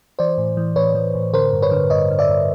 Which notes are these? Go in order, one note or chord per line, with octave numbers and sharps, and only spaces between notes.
E3 C5 D5
A2
E3
A2 B4 C#5
E3
A2
D3 A#4 C5
G2
B4 C#5
D3
G2 C#5 D#5
D3
D5 E5
G2